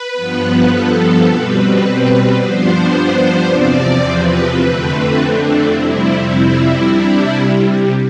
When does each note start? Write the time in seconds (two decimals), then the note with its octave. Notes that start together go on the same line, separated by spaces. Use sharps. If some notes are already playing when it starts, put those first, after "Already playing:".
Already playing: B4
0.13 G2 F3 B3
0.69 A4
1.25 B2 G3 C4 B4
2.37 G2 F3 B3 D4 C5
2.91 C5
3.47 E2 C3 F3 C4 D5
4.03 B4
4.58 F2 D3 A3 C4
5.14 D4
5.70 F2 C3 G3 C4 E4
6.25 E4
6.81 C3 G3 D4